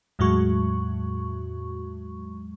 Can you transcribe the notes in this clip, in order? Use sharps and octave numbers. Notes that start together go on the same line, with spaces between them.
E2 A2 F#3 G#3 F#4 C#6